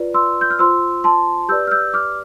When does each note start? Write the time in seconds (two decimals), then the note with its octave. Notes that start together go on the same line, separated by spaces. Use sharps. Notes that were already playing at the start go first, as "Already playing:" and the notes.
Already playing: F4 B4 D5
0.14 C6 E6
0.41 G6
0.51 F6
0.59 F4 C5 C6 E6
1.04 A5 C6
1.49 G4 B4 D5 E6 G6
1.67 F6
1.71 E6 G6
1.94 D6 F6